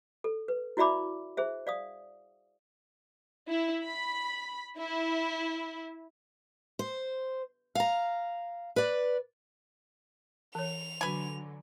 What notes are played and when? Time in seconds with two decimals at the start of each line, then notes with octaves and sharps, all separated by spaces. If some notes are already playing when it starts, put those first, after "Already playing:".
0.24 A4
0.48 B4
0.77 E4 F#4 D5 E5 B5 D6
1.37 G#4 C5 E5
1.67 D5 F5 D#6
3.49 E4
3.85 B5
4.78 E4
6.79 C5
7.75 F5 A#5
8.76 B4 D5
10.55 E3 C#5 F7
11.01 D3 F#3 B4 G#5